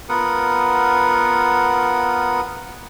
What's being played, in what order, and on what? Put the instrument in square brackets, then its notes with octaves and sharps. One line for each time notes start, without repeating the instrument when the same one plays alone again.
[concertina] B3 F4 A#4 F#5 D#6